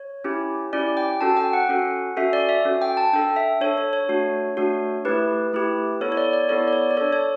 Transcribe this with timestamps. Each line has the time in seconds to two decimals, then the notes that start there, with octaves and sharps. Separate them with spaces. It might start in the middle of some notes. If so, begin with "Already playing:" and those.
Already playing: C#5
0.24 C#4 E4 G4
0.73 C#4 E4 G4 D5
0.97 G5
1.21 C#4 F#4 A4 A5
1.37 G5
1.53 F#5
1.69 C#4 F#4 A4
2.17 C#4 F#4 A4 E5
2.33 D5
2.49 E5
2.65 C#4 F#4 A4
2.82 G5
2.97 A5
3.13 D4 A4 G5
3.36 E5
3.61 D4 A4 C#5
3.78 C#5
3.93 C#5
4.09 A3 D4 F#4
4.57 A3 D4 F#4
5.05 A3 E4 G4 B4
5.53 A3 E4 G4
6.01 B3 E4 A4 C#5
6.12 C#5
6.17 D5
6.33 D5
6.49 B3 E4 A4 C#5
6.68 D5
6.73 C#5
6.90 D5
6.97 D4 A4 C#5
7.13 C#5